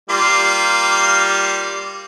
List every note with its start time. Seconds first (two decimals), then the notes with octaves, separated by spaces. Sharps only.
0.10 G3 A#3 F4